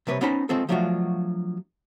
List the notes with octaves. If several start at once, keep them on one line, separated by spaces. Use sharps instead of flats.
C3 G3 B4 C#5
B3 C#4 D#4 C5 A#5 B5
D#3 G#3 C4 F4 A4
F3 F#3 A3 D4 F4 F#4